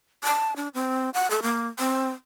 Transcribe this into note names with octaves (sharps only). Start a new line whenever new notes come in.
A5
D4
C4
F#5
A4
A#3
C4